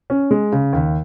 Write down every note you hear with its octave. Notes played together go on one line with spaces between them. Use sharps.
C#4
G#3
C#3
D#2